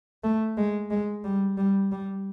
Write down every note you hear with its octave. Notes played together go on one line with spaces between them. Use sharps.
A3
G#3
G#3
G3
G3
G3